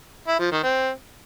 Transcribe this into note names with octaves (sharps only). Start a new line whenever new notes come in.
E4
F3
D#3
C4